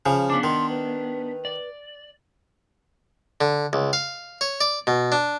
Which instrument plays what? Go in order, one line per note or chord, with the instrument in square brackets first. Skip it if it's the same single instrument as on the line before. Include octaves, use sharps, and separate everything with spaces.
[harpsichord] C#3 F3
[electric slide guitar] B3 D4 [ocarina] D6
[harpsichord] D#3 [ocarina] C6
[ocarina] B4
[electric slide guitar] D5
[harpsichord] D3
C#2
F5
C#5
D5
B2
D4